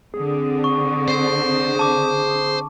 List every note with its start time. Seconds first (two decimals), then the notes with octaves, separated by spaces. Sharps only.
0.14 D3 C4 G#4
0.64 C#6
1.08 C5
1.79 A5 D6